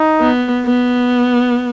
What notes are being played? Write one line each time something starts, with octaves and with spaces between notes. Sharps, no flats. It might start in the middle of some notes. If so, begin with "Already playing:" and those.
Already playing: D#4
B3
B3